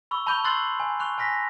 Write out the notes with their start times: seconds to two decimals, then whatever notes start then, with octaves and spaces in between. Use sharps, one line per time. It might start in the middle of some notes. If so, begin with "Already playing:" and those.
0.11 B5 C#6 E6
0.27 A5 B5 C#6 G6 D#7 F7
0.44 C6 C#6 E6 F#6 A6 C7
0.80 G#5
0.99 C#6 F#6 F7
1.18 G#5 F6 A#6 B6